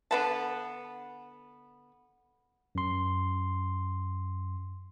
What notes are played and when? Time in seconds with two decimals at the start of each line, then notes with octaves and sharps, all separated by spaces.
0.11 D3 B3 A5
2.75 F#2 C6